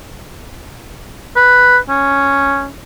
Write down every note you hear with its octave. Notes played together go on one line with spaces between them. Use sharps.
B4
C#4